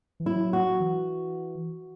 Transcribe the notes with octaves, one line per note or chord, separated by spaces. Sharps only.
E3
F#3 E4
F#4
E3